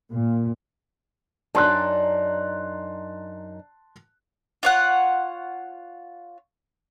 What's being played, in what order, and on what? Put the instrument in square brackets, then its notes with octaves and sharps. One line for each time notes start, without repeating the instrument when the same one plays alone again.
[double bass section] A#2
[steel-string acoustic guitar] F#2 D4 D#4 [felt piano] A5 C6 F#6
[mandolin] F4 C#5 F#5